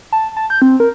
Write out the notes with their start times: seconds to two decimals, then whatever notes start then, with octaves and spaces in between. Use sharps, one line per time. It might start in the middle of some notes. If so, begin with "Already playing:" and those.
0.12 A5
0.37 A5
0.50 G6
0.62 C4
0.80 A#4